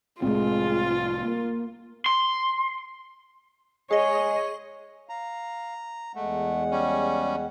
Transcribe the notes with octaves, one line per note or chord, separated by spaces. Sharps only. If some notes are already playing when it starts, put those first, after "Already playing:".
C2 A2 G#3 C4 F4
A#3
C6
G#3 G#4 C#5 D#5
F5 A#5
E2 G#3 A3 F#5
G3 C#4